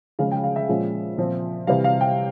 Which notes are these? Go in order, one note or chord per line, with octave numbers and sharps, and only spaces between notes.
C#3 F3 G#3 C#4 F5
G5
F5
E5
A#2 F3 G#3 C#4
A#2 F3 C4
C3 E3 G3 F5
F5
G5